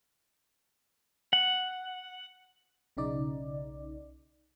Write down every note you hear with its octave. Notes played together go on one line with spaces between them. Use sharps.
F#5
B1 C#3 D#4 D5